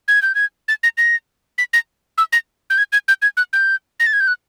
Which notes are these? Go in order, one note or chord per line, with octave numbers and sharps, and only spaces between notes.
G#6
G6
G#6
A6
A#6
A#6
B6
A#6
E6
A#6
G6
G#6
G#6
G6
G#6
F#6
G6
A#6
A6
G#6
G6
F#6